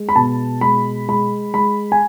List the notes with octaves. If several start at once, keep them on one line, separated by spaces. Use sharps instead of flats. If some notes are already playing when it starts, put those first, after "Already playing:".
Already playing: G#3
B5
B2 A5
G#3 B5
G#3 B5
G#3 B5
G#5